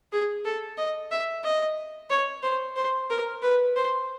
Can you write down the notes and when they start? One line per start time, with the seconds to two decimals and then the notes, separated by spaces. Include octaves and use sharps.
0.12 G#4
0.45 A4
0.78 D#5
1.11 E5
1.43 D#5
2.10 C#5
2.43 C5
2.76 C5
3.10 A#4
3.42 B4
3.76 C5